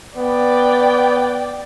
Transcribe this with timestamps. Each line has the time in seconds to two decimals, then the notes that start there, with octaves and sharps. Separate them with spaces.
0.17 B3 D5 G5